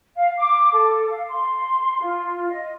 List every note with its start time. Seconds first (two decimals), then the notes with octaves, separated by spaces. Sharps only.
0.15 F5
0.38 D6
0.73 A4
1.10 F5
1.28 C6
2.00 F4
2.50 D#5